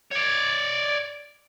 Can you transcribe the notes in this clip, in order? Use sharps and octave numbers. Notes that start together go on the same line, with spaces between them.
C#5 D5